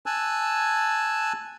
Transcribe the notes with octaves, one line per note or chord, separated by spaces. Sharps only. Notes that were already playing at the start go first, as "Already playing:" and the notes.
G#5 A5 E6 F#6